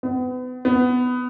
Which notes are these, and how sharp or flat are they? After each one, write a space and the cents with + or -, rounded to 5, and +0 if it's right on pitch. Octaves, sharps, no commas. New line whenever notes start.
B3 +35
B3 +15